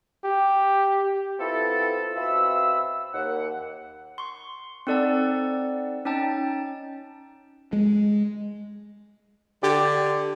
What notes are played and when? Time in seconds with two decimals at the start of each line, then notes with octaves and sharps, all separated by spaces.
0.24 G4
1.39 B3 C4 E4 F4 A4
2.16 B2 C4 E5 F5 B5 E6
3.13 D#2 F#5
4.18 C6 C#6
4.87 C4 D#4 A4 D5 F#5 A5
6.05 C#4 D#4 G5 A5
7.73 G#3
9.63 D3 G4